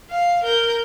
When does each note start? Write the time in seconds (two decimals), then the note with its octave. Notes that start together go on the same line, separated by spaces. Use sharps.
0.11 F5
0.44 A#4 G6